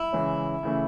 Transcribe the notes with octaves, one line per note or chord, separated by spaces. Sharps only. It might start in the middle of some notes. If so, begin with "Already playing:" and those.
Already playing: E4
C#3 E3 G#3 C#4
C#3 E3 A3